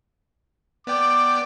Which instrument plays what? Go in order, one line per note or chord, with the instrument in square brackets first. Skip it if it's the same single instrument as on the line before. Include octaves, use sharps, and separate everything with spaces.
[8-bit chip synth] B3 D5 G5 [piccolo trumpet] D6